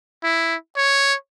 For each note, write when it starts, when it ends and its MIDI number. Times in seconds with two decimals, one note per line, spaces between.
0.24 0.56 64
0.77 1.14 73